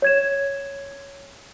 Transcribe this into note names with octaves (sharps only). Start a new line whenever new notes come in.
C#5 G#6 E7